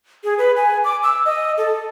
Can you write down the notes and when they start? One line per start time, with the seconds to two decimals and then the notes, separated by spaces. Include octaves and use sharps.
0.24 G#4
0.38 B4
0.56 G#5
0.84 D6
1.03 E6
1.25 D#5
1.58 A4